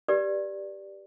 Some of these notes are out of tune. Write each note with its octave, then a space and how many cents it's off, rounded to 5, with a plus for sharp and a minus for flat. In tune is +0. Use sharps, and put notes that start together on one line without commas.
G4 +0 B4 -40 D5 +0